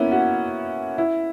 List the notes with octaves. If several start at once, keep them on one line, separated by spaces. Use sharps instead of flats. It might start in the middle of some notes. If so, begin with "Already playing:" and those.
Already playing: A#3 B3 C#4 E4
F#4
E4